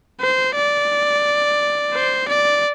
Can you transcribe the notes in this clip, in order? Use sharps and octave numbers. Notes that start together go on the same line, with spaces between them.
C5
D5
C5
D5